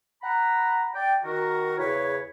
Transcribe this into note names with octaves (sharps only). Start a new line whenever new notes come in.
F#5 A#5 B5
D5 G5
D#3 F#4 A#4
E2 C#3 E4 B4 C#5